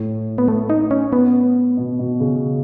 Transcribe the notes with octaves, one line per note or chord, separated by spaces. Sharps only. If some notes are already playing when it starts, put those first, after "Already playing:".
Already playing: A2
B3
A3
D#4
C#4
B3
B2
B2
C#3